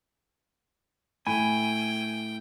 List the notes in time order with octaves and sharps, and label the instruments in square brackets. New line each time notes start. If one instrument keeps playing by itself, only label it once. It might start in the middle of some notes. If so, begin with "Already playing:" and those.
[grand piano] A2 B5 [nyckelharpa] G5 [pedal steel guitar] G#5